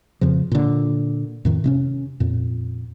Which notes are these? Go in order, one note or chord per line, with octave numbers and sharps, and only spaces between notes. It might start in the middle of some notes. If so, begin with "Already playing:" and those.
F2 C#3 F3
A#2 D3
F2 A2 D#3
C3 C4 C#4
F2 A#2